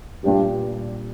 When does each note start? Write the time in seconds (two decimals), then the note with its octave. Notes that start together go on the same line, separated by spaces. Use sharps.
0.24 G2 A#2 G3 D4 G4